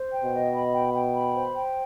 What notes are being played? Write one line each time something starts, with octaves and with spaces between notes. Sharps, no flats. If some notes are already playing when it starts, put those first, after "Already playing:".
Already playing: C5
G5
B2
D#5
B5
G5
G5
B5
C5
G5